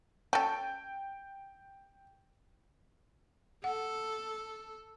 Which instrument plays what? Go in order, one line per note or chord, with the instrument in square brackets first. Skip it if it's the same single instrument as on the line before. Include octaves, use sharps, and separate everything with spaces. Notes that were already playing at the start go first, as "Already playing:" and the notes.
[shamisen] C#4 A4 [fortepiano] G5
[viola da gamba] A4 [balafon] F#5